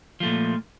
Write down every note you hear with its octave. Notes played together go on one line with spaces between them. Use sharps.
A#2 F3 A3